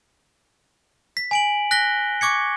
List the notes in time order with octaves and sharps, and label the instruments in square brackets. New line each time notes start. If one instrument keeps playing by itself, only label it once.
[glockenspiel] B6
G#5 D7 F#7
F#6 A#6 B6 G7
C#6 D6 G#6 C#7